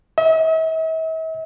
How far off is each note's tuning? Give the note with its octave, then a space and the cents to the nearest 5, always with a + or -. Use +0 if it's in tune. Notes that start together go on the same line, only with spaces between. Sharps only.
E5 -45